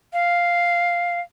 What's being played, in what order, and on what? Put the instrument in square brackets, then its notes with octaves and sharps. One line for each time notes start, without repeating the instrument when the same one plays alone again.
[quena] F5